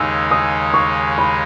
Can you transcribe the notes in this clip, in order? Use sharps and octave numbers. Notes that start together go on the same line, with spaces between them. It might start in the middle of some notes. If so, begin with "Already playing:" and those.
Already playing: D#2 C#3 G#3 D#4 E6
D#6
C#6
B5